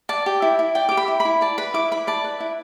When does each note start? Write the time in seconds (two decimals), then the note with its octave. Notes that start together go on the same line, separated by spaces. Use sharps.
0.09 D5 A5
0.26 G4
0.42 E4
0.59 E4
0.75 D5 G5
0.89 G4 D6
0.97 B5
1.08 E4
1.20 B5
1.25 E4
1.41 D5 A5
1.58 B4 B5
1.74 E4 D6
1.91 E4 B5
2.07 D5 A5
2.24 B4
2.40 E4